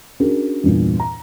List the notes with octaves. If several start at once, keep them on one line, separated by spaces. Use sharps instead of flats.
C#4 D4 F#4 G#4 A#4
E2 G2 A#2
A#5